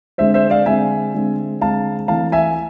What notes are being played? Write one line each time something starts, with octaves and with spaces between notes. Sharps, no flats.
D3 G#3 C4 C5 E5
C5 E5
D5 F5
D3 G#3 C4 E5 G#5
D3 G#3 C4
D3 G#3 C4 F5 A5
E3 A3 C4 F5 A5
E5 G#5